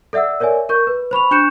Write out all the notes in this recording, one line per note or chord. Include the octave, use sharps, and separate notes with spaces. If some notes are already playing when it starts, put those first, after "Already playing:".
A4 D5 E5 F#5 E6
A#4 C#5 D5 E5 G#5
A#4 C#6 G6
B4
C5 B5 C#6 F7
D4 C#6 F#6 G6 C#7 E7